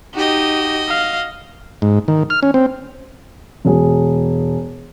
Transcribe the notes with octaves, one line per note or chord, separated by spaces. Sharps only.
D#4 F#4 G4 D#5
F5
G#2
D#3
F6
C#4
C4
E1 G#4